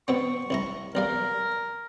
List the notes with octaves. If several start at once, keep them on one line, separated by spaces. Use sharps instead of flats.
B2 B3 C4 C#6
C2 E4 A#5
B1 G3 A#4 F5